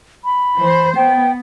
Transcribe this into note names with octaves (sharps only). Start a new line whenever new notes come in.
B5
E3 C5
B3 G5